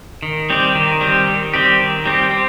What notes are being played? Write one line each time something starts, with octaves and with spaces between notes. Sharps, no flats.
D#3
G3 C4 G4
D#3
G3 C4 G4
D#3
G3 C4 G4
D#3
G3 C4 G4
C4